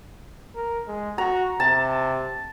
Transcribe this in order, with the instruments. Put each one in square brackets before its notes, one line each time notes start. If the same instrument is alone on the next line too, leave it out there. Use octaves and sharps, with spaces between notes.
[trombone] A#4
G#3
[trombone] F#4 [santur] A#5
[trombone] C3 [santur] A5